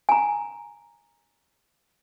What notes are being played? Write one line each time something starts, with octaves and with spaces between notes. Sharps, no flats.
G#5 A#5